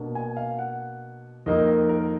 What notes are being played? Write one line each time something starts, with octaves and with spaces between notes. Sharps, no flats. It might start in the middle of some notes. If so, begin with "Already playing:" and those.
Already playing: B2 A#3 D4
G#5
F5
F#5
F2 D#3 A#3 D#4 D#5
A#4